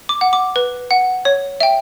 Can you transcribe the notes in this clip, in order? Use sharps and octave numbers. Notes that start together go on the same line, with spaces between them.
D6
F#5
D6
B4
F#5
C#5
E5 G5